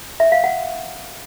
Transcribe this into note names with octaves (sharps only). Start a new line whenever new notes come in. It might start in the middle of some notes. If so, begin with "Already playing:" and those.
E5
F5
F#5